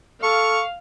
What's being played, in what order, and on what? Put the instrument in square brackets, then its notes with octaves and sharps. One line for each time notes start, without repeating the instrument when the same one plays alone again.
[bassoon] A4 [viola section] F5 [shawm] C#6